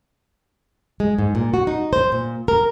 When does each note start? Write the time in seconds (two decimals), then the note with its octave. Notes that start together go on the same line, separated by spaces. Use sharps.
1.00 G#3
1.18 G#2
1.35 A#2
1.54 F#4
1.67 D#4
1.93 C5
2.12 A#2
2.48 A#4